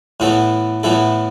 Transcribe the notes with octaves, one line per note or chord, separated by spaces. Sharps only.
A2 E3 B3 E4 A4
A2 E3 B3 E4 A4